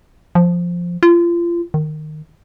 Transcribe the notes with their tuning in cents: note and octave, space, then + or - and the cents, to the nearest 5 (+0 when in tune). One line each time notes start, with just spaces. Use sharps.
F3 +0
F4 -30
D#3 -20